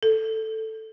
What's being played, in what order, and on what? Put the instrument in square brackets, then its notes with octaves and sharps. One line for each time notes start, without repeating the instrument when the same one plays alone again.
[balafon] A4